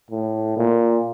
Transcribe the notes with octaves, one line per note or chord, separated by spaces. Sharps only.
A2
A#2